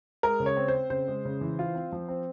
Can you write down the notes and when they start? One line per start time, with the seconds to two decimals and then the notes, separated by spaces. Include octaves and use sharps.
0.23 G#3 A#4
0.40 C#3
0.46 C#5
0.57 C4
0.68 C5
0.74 C4
0.90 C#3 C5
1.08 G#3
1.25 C#3
1.41 E3
1.59 F4
1.75 C4
1.92 F3
2.09 C4